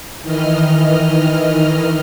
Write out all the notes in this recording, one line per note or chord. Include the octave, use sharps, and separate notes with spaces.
D#3 E3 D#5 F6